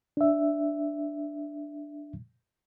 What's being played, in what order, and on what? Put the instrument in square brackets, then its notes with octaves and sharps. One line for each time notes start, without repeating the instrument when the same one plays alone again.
[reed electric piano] D4 E5